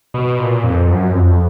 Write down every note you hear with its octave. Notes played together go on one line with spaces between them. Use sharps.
B2
A#2
F2
F#2
F2